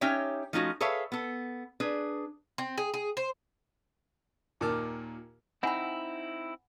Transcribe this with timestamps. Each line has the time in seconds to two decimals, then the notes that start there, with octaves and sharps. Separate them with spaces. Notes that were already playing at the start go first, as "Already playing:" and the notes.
0.01 C#4 D#4 G4 C#5 E5 G5
0.53 F3 A3 C#4 D#4 F4 F#4
0.81 G#4 A4 B4 C#5 E5 F5
1.12 B3 A4
1.80 D4 G#4 B4
2.58 C4
2.78 G#4
2.94 G#4
3.17 C5
4.61 D#2 A#2 D#3 A5 D6 F6
5.63 C4 D#4 E4 F#5 G#5 B5